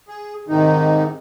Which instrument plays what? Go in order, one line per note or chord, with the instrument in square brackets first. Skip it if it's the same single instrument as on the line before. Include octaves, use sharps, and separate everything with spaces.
[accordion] G#4
[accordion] G#2 C3 D#4 [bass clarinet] D#3